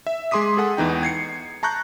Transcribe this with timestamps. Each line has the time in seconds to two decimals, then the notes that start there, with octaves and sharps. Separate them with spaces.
0.07 E5
0.31 G#3 G#4 C6 D6 D#6 B6
0.57 G#4 A4 F#5 G#5
0.77 E2 E3 D#4 G5
1.03 G#6 C7 C#7
1.63 A5 A#5 C#6 F#6 G6